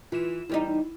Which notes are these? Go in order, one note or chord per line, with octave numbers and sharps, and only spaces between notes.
E3 F4 E7
E2 G3 D#4 E4